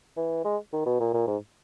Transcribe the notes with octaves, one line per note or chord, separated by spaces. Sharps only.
E3
G#3
D#3
B2
A#2
A#2
G#2